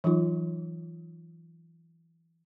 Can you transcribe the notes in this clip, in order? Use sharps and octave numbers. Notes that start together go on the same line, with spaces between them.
E3 F#3 D#4 F4